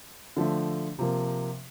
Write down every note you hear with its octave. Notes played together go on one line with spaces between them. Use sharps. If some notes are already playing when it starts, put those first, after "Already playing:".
D3 F3 A3
C3 F3 A#3